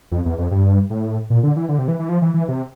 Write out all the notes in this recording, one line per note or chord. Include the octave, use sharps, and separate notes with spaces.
F2
E2
F2
G2
A2
A#2
D3
E3
D3
C3
E3
E3
F3
E3
E3
C3